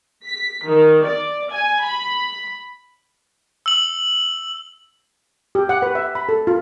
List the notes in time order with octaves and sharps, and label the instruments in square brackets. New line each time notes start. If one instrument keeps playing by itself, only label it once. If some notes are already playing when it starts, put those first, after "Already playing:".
[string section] B6
D#3
D5
G#5
B5
[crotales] E6 F#7
[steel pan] G4
F#5
B4
E5
B5
A4
F4